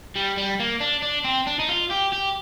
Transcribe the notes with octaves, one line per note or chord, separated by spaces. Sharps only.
G3
G3
A#3
D4
D4
C4
D4
D#4
F4
G4
G4